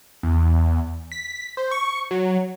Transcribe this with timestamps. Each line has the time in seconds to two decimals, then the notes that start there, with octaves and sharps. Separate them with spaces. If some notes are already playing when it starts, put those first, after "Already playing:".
0.23 E2
1.12 B6
1.57 C5
1.71 C#6
2.11 F#3